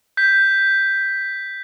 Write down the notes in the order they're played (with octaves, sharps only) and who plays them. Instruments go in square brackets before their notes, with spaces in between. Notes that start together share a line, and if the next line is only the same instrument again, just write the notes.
[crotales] G6 B6